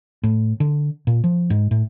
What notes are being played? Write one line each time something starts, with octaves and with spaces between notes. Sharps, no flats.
A2
D3
A#2
F3
G#2
A2